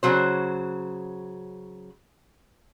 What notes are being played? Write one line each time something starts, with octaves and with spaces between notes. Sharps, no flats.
C#3 F#3 F#4 C5